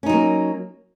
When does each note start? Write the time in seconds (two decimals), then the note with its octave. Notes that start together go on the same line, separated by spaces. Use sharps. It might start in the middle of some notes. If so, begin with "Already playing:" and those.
0.03 C#4
0.06 D#4
0.09 F#3
0.13 A#3